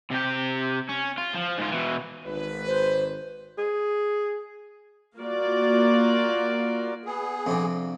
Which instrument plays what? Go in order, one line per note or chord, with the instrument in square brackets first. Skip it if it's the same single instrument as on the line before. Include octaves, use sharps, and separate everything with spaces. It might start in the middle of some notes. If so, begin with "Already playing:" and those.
[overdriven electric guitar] C3 G4
C#4
F4
F3
G#2 F4
B2 E3
[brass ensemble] G#1 B4
[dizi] C5
[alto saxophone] G#4
[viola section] A#3 F4 F#4 D5
[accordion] B3 G#4
[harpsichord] F2 C3 D4